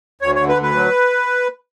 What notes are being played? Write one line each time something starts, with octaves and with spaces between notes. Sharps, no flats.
D2 C#5
C#5
D3
B4
D2
B4
F#3